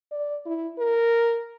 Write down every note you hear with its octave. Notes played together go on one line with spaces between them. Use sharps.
D5
E4
A#4